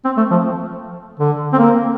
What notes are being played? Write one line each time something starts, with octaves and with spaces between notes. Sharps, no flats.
C4
A3
F3
D3
C4
A#3